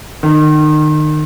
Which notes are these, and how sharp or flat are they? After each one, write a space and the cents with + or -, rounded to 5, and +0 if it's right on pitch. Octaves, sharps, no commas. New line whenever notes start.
D#3 -30